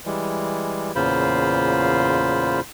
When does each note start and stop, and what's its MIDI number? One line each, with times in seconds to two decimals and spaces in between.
0.06 0.92 52
0.06 0.92 55
0.06 0.92 56
0.95 2.60 40
0.95 2.60 46
0.95 2.60 49
0.95 2.60 65
0.95 2.60 72
0.95 2.60 83